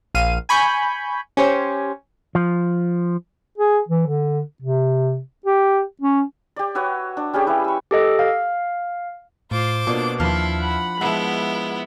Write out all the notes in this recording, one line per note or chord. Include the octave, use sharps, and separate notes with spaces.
A#1 F5 D#7
G#5 B5 C#6 G6
C#4 G4 C5 C#5
F3
G#4
E3
D3
C3
G4
C#4
G4 D5
F#4 B4 C#5 E5
D4
G3 C#4 G4 G#4
E4 B4 C#5 F5
C#6 E6
G4 A4 D#5
F5
A2 F4 C5 D6
B2 A#3 D4 F4 D5
D#2 F3 D4 E4 C6 F6
F#5 B5
F3 G#3 B3 E4 E5 F#5